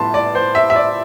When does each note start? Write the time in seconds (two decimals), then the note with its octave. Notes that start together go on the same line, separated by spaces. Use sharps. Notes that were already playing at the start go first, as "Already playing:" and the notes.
Already playing: A2 G3 B3 A5 C6
0.14 D5
0.35 C5
0.55 E5
0.70 E5
0.76 D5